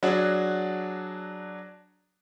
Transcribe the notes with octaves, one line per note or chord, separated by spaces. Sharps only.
F#3 D4 F#4 G#4